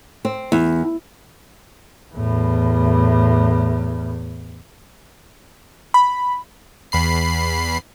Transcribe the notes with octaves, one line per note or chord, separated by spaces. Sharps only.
C4
E2
E2 A2
B5
E2 B5 C7